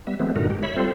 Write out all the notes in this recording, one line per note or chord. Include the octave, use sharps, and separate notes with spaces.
G3 B3 E5
E3 F#3 G#3 A3 B3 C4
G2 A#2 D3 D#4 F#4 A#4
G#3 G4
C#5 E5 B5
G3 C4 F4 A4 C5